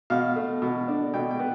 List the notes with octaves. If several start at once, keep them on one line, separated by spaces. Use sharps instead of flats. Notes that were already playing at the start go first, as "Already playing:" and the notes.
B2 F5
A3
B2
D4
B2 G5
G5
B3